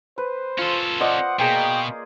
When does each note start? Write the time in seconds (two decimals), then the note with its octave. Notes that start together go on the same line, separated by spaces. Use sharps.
0.18 B4 C5
0.59 C#4 F4 A4
1.01 C5 D5 D#5 F#5
1.39 B2 A#3 G#4 G5